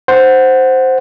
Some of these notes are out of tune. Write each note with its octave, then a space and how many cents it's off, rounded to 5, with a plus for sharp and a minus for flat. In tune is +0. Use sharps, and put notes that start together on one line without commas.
C5 +0 F#5 +0